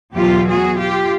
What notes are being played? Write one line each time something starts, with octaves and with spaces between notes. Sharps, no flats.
E2 B2 F#3 F4 G4
F#4 G#4
F4 G4